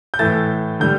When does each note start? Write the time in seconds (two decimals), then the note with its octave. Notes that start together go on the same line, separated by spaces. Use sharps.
0.14 G6
0.19 A2 E3 A3 A6
0.80 D3 G3 G6